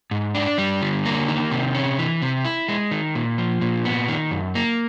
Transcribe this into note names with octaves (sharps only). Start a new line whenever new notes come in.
G#2
D4
G3
D3
A#3
D#3
C3
C#4
E3
C3
E4
G#3
D#3
A#2
F3
A#2
B3
D#3
F#2
A#3